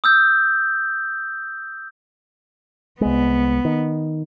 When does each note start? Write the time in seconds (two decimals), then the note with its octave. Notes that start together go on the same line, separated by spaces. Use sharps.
0.04 D#6 E6 G6
3.01 C2 G#3 B3
3.65 D#3